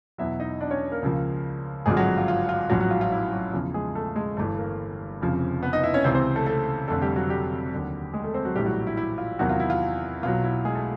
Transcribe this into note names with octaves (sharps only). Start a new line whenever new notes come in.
E2 B2 F#3 E4 E5
D#4 D#5
D4 D5
C#4 C#5
A#3 A#4
C#2 C#3 F3
G#1 G2 D3 F3 G#3 G#4
F#3 F#4
F4
F4
F4
A1 G#2 F3 F#3 F#4
F#3 F#4
F4
F4
E4
F#3 F#4
E2 C#3 F3
G#3 G#4
A3 A4
G#3 G#4
G1 G2 E3 A3 A4
A#3 A#4
F1 F2 C#3 F3
B3 B4
D#4 D#5
E4 E5
C#4 C#5
C#2 C3 E3 C4 C5
C4 C5
A3 A4
A3 A4
F1 F2 D3 A3 A4
G3 G4
F#3 F#4
G3 G4
D#2 D3 F#3
G#3 G#4
A3 A4
C4 C5
F#3 F#4
A#1 A2 E3 G3 G4
F#3 F#4
E4
E4
F4
E2 C3 D#3 F#3 F#4
F4
E4
F4
B1 B2 F#3 F4
E4
G#3 G#4
A3 A4